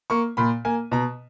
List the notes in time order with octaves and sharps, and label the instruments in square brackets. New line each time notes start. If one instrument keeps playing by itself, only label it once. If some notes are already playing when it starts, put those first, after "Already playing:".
[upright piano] A#3 C#6
A#2 B5
A#3 G#5
B2 A#5